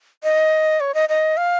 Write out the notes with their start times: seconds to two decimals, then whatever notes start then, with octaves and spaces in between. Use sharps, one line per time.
0.23 D#5
0.80 C#5
0.94 D#5
1.09 D#5
1.37 F5